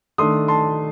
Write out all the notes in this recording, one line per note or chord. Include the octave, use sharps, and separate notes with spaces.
D#3 A3 D4 C6 D#6
A5 C6